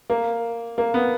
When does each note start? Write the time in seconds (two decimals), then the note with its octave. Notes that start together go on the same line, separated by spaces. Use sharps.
0.10 A#3
0.78 A#3
0.94 B3